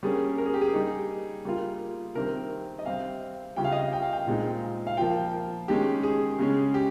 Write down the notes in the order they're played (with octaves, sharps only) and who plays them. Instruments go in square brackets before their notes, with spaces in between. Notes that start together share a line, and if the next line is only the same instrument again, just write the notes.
[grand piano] G3 A#3 C#4 G#4
A#4
G#4
G4
G#4
G3 A#3 D#4
G3 A#3 F4
C3 D#3 G3 C4 A#4
D#5
C3 G3 C4 F5
C#3 G3 C#4 F4 G5
F5
D#5
F5
G5
F5
G5
A#2 G#3 C4 D#4
F5
F3 A#3 F4 G5
D#3 G#3 C#4 G4
G#4
C#3 G#3 C#4
G4